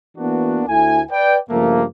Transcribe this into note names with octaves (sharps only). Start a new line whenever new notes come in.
E3 A#3 B3 D4 F#4
D2 A3 E4 G#5
B4 D5 G5
G2 C#3 F3 A3 A#3